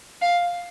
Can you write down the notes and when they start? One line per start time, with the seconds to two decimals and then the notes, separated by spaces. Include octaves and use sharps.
0.21 F5